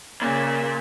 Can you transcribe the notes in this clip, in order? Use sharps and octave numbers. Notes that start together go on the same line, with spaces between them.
A#2 C#3 E5